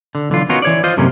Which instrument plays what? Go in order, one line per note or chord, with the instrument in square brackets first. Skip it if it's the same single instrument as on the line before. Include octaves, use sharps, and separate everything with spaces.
[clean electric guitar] D3
B1 D3 E3 F4
B3 C#4 D#4 F4 F#4 A#4
E3 C#5 D5
F4 C5 D#5
F#2 A2 C3 E3 A#3 C#4